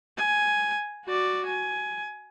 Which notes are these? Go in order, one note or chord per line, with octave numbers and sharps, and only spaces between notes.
G#5
F#4 D5
G#5